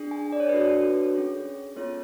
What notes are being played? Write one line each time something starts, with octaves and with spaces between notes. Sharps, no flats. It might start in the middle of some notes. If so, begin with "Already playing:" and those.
Already playing: D4 G#4
G#5
D5
C#5
B4
D4 F#4 A4 C#5
C#4 G#4
B3 F4 A4 C#5